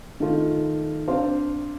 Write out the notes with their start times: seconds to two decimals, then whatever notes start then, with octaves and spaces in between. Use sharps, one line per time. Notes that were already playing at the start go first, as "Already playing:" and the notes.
0.20 D#3 A3 F4
1.08 C4 D4 C5 F5